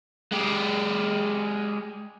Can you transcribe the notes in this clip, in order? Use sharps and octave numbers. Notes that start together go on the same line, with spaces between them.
G#3 G4